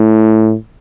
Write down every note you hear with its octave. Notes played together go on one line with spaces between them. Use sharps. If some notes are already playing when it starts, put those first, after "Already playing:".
Already playing: A2